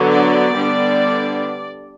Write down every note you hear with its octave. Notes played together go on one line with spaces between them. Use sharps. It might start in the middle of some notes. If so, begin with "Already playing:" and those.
Already playing: D3 F#3 B3
D5
D3 G3 B3 D4